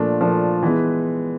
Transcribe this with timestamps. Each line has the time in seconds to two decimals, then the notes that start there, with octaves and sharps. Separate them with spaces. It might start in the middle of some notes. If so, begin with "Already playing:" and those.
Already playing: A#2 F3 A3 D4
0.21 A#2 F3 A3 D4
0.63 E3 G#3 B3